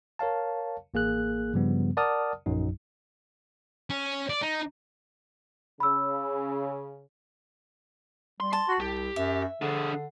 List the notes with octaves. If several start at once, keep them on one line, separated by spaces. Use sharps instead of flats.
A#4 C#5 F5 A5
A1 A#3 G#4 F#6
G2 C#3 F3 G3 B3
A#4 D5 F#5 A5 D#6 F6
A#1 F#2 F#3 D#4
C#4
D5
D#4
C#3 B5 E6
G3 C6
A5 C6
F#4
C2 G4
F#2 E5
D3 D4 G#4